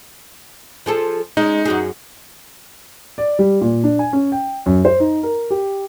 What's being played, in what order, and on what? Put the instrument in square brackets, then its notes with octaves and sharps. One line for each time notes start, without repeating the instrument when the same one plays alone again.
[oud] F3 G#4 A4
[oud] G#3 C#4 [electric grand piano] D#4
[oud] F#2 F#4 G#4
[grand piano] D5
G3
A#2
D4
G#5
C#4
G5
F#2
C5
D#4
A#4
G4